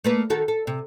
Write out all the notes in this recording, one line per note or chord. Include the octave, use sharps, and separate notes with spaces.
A3 A#3 B4
D#3 F#4 A4
A4
C3